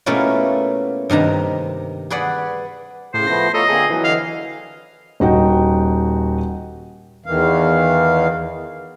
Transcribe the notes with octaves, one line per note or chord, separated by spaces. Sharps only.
B2 A3 A#3 C#4 E4 F4
G2 C3 D#3 A#5
G#4 B4 D5 F#5
A2 C#3 C5
F3 A3 B3 A#6
F4 A4 C#5 D#5 A#5
D3 A#3 C4 G#4
E3 F#3
D3 D#5 F5
D#1 D#4 F#4 G5
E2 D#3 E3 F5